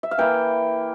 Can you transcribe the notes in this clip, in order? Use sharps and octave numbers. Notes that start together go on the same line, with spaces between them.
E5
F5
E3 A#3 E4 G5